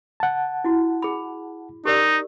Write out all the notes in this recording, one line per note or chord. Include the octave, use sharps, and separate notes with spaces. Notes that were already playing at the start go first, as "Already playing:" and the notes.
F#5 A5
E4 F#4
G#4 B5
D#4 G4 A#4 D5